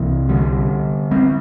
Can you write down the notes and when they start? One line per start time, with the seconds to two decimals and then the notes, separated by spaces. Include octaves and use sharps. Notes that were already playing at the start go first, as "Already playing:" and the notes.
Already playing: C2 C3 E3
0.29 D3 G3
1.11 G3 C4